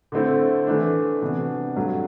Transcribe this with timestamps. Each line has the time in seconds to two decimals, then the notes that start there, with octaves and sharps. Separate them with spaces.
0.12 D3 A3 C4 E4
0.67 E3 A3 D4
1.22 C3 E3 B3 D4 F#4
1.76 G2 F#3 A3